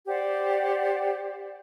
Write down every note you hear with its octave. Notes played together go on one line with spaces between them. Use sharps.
G4 C5 D5 F#5